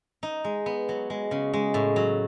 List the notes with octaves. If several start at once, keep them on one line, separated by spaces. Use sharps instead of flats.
D#4
G#3
B3
F#3
G#3
C#3
G#3
A2
F#3